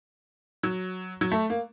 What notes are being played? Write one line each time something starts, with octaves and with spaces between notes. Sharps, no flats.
F#3
F#3
A3
A#3